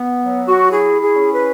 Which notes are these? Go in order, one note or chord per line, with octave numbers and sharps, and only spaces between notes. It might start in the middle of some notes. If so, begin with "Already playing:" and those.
Already playing: B3
F#3
F#4
E4 G#4
G#4
C#4
B4